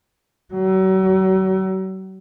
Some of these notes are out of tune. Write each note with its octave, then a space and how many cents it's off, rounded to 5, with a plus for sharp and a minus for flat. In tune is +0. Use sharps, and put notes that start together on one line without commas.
F#3 +40